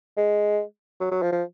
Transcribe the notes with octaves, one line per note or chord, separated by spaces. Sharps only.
G#3
F#3
F#3
F3
F3